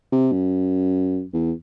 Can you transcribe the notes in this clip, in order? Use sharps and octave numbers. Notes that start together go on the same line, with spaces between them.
C3
F#2
E2